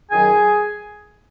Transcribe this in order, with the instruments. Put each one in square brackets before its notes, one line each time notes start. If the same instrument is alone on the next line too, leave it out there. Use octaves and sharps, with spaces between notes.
[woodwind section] F#2 D#3 F#3 G#4 G#5